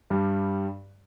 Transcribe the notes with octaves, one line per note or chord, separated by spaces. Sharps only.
G2 G3